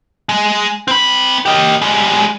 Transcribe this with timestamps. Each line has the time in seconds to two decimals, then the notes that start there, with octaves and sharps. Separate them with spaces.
0.29 G#3
0.88 C4 B5
1.46 G4 D#5
1.82 G3 G#3